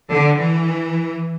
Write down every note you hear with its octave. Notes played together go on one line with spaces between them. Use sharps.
D3
E3